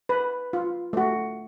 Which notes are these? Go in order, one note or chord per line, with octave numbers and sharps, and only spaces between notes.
B4
F4
A3 F#4